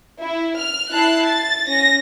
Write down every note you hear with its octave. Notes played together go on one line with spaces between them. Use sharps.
E4
F6
E4 A5 F#6 C7
A6
C#4 A#6